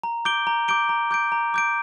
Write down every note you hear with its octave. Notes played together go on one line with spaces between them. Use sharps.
A#5
D6 G6 D7 G7
A#5
D6 G6 D7 G7
A#5
D6 G6 D7
A#5
D6 G6 D7